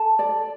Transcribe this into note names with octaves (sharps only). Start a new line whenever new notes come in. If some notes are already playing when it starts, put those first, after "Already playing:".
Already playing: A4 A5
D5